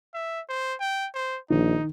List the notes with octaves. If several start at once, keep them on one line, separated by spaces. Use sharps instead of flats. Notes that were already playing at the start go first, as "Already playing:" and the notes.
E5
C5
G5
C5
A#1 D#3 D#4